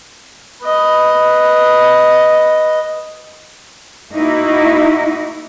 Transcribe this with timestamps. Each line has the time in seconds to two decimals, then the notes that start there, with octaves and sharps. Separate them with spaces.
0.63 B4 D#5
4.12 A#3 D#4 E4 F#4